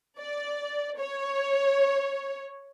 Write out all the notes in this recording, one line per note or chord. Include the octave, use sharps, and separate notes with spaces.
D5
C#5